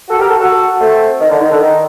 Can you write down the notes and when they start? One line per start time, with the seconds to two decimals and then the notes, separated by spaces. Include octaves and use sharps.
0.09 F#4 A4
0.19 G4 A#4
0.28 F#4 A4
0.39 F#4 A4
0.79 A3 C4
1.20 D#3
1.30 D3
1.39 D#3
1.50 D3
1.60 D#3